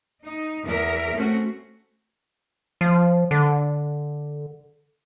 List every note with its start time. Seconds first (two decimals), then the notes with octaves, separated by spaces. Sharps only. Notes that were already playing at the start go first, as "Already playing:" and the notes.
0.23 D#4
0.65 E2 A#4 E5
1.16 A3 C4 C#4 F#4
2.81 F3
3.31 D3